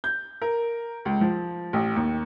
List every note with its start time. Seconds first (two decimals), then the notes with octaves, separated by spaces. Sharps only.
0.04 G6
0.41 A#4
1.05 C#2
1.21 F3
1.73 A1
1.96 D#2